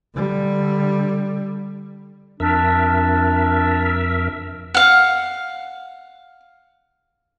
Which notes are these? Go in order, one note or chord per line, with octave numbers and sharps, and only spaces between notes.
D3 G3
F2 D4 A#4 E5
F5 F#5